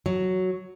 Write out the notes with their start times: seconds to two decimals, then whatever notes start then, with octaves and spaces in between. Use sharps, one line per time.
0.06 F#3